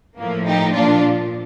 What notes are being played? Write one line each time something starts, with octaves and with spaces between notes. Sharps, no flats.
A2 F3 A#3
D#4 G4
A#2 F3 D4 F4